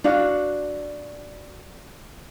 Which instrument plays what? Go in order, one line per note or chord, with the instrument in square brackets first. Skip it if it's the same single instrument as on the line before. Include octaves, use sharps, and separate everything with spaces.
[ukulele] D4 F#4 F5